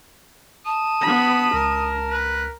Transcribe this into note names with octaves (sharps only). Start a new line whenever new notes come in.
A5 D#6
B3 B5
C#2 A#4
B4